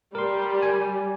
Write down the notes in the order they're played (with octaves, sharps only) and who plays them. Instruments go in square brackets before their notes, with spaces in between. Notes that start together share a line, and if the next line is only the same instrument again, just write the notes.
[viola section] G3 [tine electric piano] A#4 C6
[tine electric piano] G#5